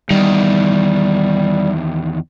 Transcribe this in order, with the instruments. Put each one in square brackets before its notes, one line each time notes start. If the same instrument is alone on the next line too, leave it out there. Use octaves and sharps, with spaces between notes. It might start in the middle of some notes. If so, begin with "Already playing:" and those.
[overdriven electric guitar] E2 D#3 [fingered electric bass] G3